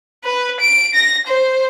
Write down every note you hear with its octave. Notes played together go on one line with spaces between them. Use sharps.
B4
D7
A#6
C5